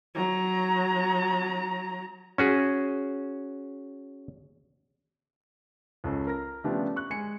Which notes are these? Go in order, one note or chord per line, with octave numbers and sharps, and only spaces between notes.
F#3 A#5
C#4 F#4 G#4
C#2 C#4 A4
A#4 A#6
C#3 F3 A3 B3 D4 G4
C#6 F#6
G#3 G#5 C#7